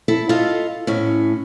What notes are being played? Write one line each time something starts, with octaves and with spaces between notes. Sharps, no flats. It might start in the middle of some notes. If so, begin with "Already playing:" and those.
E4 A4
F4 A4 D#5 F5
A2 C#4